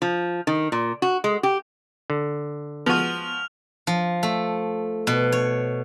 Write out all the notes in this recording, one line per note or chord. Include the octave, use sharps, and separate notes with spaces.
F3
D#3
A#2
F#4
G#3
G4
D3
F3 G#3 B3 F#4 F6 D#7 F7
F3
A3
B2
C#5